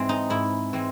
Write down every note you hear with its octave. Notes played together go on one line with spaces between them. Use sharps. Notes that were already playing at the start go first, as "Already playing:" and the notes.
Already playing: G#2 E3 G#3 C4
D#4
G#2 E4
E3 G#3 C4